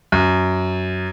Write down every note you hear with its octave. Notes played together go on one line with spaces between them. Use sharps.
F#2